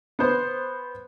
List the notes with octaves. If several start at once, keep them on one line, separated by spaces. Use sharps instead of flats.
B3 C5